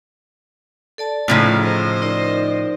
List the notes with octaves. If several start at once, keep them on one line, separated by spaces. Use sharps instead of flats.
A4 D5 A5
A2 C#3 F3 D#4
C5 D#5 A#5
D#4 A#4 D5